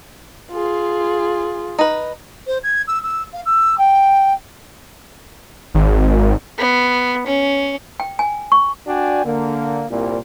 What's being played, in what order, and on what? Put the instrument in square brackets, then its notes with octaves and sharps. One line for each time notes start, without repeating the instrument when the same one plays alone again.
[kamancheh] F4 G#4
[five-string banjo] D#4 B4
[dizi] C5
G#6
E6
E6
F5
E6
G5
[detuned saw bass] G#1
[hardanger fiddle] B3
C#4
[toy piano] G5
G#5
C#6
[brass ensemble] D4 F#4 D5 G5 G#5
D3 A#3
C2 A#2